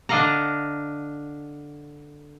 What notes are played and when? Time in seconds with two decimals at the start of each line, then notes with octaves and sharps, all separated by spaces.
0.09 D3 D4 D#5 F5 F#5 A#5